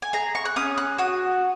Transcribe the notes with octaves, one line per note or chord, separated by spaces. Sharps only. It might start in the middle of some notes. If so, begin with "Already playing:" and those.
G#5
G#4 A#5
C#6
F#6
C#4 D#6
F#6
F#4 D#6